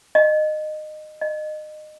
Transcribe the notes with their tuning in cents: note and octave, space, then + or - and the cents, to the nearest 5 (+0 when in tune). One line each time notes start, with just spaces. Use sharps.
D#5 -20
D#5 -25